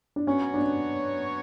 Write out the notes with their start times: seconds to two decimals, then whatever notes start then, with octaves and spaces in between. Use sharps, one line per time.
0.16 D4
0.27 F#3 B3 C#4 F#4 C#5
0.54 D4
0.62 C#4